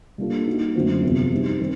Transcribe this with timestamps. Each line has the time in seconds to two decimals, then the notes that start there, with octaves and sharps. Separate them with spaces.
0.18 G3 A#3 D4 F4 A4
0.47 A#3 D#4 F#4
0.75 F#2 D3 F#3 A3 C4
1.03 E2 C3 F3
1.32 G3 C4 D#4
1.60 D#3 G3 C4